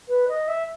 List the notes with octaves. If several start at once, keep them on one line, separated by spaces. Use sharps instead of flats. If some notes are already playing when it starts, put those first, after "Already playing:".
B4
D#5
E5